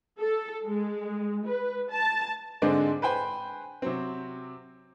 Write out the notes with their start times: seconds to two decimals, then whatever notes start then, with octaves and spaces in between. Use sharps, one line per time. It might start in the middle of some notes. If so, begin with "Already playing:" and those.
0.20 A4
0.66 G#3
1.46 B4
1.90 A5
2.62 G#2 D3 G#3 C4 D4
3.02 B4 C5 G5 G#5
3.82 C3 F#3 C4